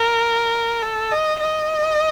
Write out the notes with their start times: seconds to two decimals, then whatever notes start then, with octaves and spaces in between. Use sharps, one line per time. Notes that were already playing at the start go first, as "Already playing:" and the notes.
Already playing: A#4
0.82 A4
1.11 D#5
1.40 D#5